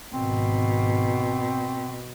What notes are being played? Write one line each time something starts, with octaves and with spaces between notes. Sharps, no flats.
G#1 B2 C4